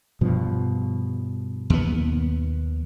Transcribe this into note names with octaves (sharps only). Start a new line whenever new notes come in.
G2 B2 F3
D#2 B3